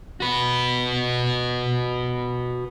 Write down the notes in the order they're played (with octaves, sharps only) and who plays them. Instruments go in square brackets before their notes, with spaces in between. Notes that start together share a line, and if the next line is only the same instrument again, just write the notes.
[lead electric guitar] F#4 B4